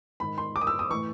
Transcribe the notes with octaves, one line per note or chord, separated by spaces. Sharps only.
G#2 D#3 B5
C6
D6
D#6
E6
D#6
A2 E3 C#6